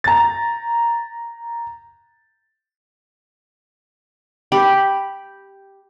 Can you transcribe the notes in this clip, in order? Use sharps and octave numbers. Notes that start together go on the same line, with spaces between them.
A#5 A6
G4 B5